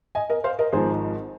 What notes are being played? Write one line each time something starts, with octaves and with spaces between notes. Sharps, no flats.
D#5 G#5
A#4 D#5
C5 F5
A#4 D#5
G#1 G#2 F3 G#4 C5